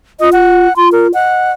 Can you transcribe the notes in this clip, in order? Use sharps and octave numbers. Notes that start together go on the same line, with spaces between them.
F4 D#5
F#5
F4 C6
A#4
D#5 F#5